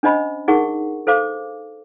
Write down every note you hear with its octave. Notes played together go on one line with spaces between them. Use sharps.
C#4 D4 C5 D#5 B5
D#4 G#4 A#4 F#5 C#6
A4 C5 F5 D6